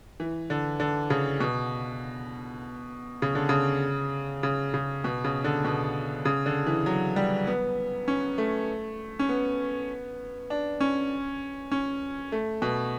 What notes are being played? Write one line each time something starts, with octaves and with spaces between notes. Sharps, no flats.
E3
D3
D3
C#3
B2
C#3
D3
C#3
C#3
C#3
B2
C#3
D3
B2
C#3
D3
E3
F#3
G3
B3
C#4
A3
C#4
B3
D4
C#4
C#4
A3
B2